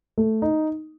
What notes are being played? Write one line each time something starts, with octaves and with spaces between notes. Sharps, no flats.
A3
D#4